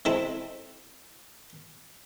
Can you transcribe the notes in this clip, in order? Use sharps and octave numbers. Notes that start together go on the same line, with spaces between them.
G#3 C4 E4 A4